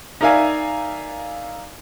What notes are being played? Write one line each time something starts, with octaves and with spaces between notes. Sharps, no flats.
D#4 A#4 D5 E5 F5 G#5